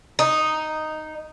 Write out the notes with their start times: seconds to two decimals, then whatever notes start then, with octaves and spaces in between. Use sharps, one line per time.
0.19 D#4